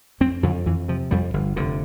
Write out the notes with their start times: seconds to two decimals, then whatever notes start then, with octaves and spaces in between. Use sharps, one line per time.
0.20 F2 C4
0.43 F2 D3
0.66 F2 E3
0.88 C3 F3
1.11 F2 G3
1.34 G1
1.56 F1 D3